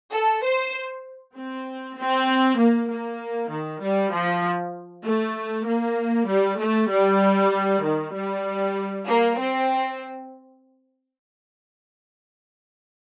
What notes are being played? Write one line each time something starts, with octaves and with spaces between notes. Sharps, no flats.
A4
C5
C4
C4
A#3
A#3
D#3
G3
F3
A3
A#3
G3
A3
G3
D#3
G3
A#3
C4